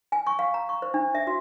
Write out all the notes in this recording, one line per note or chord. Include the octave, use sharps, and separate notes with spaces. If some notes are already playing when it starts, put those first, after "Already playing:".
G#5
C#6
F5
A#5
C#6
C5
D4
E5
F#4